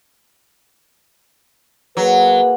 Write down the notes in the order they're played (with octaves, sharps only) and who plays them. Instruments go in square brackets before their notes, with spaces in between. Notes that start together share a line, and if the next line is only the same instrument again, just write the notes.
[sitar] F#3 [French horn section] A#3 G#4 B4